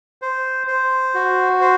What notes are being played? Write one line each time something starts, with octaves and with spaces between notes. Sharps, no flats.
C5
C5
F#4
C5